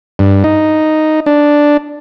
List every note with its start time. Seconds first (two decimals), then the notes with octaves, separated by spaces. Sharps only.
0.19 G2
0.44 D#4
1.26 D4